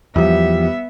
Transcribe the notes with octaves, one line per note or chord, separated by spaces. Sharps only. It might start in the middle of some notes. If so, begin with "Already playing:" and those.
E2 F3 G3 B3 E5